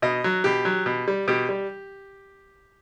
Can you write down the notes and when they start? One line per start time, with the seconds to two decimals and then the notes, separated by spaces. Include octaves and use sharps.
0.02 B2 D#5
0.24 F#3
0.44 B2 G4
0.65 F#3
0.86 B2
1.08 G3
1.28 B2 G4
1.49 G3